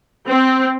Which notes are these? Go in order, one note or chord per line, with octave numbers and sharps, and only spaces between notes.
C4